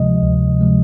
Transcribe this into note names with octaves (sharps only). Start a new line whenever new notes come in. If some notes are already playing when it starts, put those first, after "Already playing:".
Already playing: D2 C3 F3 G#3 D#5
D2
C3 F3 G#3